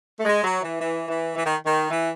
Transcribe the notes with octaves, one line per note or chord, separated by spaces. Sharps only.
A3
G#3
F#3
E3
E3
E3
E3
D#3
D#3
E3